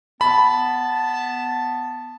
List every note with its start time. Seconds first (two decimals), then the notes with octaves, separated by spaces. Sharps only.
0.21 B3 A5 B5